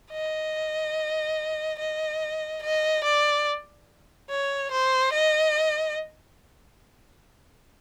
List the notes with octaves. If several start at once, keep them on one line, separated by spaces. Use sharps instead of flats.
D#5
D#5
D#5
D5
C#5
C5
D#5